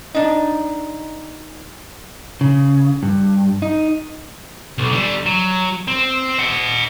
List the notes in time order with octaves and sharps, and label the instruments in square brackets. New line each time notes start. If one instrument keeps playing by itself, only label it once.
[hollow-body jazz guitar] D4 D#4
[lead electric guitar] C#3
G2
D#4
[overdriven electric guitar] B1
D3 G3
F#3
C4
D#5 F#5